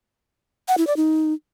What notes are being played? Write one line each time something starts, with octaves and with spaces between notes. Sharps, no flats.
F#5
E4
D5
D#4